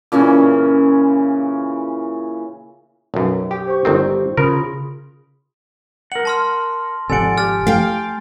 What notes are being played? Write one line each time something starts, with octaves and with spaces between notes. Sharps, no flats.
A#2 C#3 E3 C#4
B1 F#2
G4
C5 C#6
G1 D#3 C4
C#3 F4 G#4 A#4 B5
A#4 F#5 F#7
A5 C6 F6
G#1 F2 C3 A4 D5 F#5 G#5 D7
G4 F6 A6
A3 F5 G5